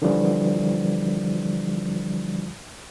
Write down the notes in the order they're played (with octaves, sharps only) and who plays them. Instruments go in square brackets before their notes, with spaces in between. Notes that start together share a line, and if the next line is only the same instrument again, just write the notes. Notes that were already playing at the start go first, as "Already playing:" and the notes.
[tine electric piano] D3 E3 F3 G3